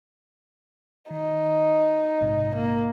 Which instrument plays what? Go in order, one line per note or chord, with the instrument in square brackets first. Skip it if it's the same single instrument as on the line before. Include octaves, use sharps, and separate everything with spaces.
[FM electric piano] D#3 [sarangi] D#4
[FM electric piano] A#1 G#2 C3
[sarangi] A#3